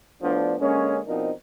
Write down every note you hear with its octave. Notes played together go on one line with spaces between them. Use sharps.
A2 F3 B3 D4
D3 G#3 A#3 C#4
B2 F3 C4 D4 D#4 A#4